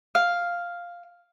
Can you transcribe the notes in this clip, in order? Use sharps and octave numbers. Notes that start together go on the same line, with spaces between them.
F5